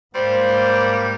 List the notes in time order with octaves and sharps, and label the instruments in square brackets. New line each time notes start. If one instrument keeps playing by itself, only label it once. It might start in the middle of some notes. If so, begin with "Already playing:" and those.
[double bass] G#2 [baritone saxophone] G3 [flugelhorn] A#3 [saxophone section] C5